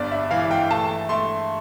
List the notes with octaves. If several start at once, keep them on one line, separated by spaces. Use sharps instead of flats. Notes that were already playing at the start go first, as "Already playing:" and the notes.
Already playing: G1 G2 D5
E5
E3 F5
G5
A3 A5
A3 C6